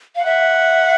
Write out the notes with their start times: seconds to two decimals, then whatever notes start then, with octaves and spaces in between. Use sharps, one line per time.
0.15 F5
0.24 E5 F#5